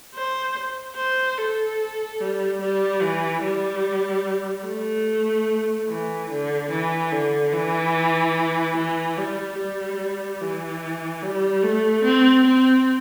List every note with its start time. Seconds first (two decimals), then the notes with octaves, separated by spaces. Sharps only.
0.15 C5
0.96 C5
1.38 A4
2.21 G3
2.61 G3
3.02 E3
3.43 G3
4.67 A3
5.89 E3
6.30 D3
6.71 E3
7.12 D3
7.53 E3
8.77 E3
9.17 G3
9.58 G3
10.41 E3
11.22 G3
11.63 A3
12.04 C4
12.46 C4